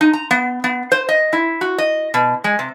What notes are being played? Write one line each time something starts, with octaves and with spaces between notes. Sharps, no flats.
D#4
A#5
B3
B3
C5
D#5
E4
F#4
D#5
B2
G#3
C3